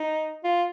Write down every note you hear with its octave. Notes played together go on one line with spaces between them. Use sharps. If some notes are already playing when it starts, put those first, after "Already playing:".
Already playing: D#4
F4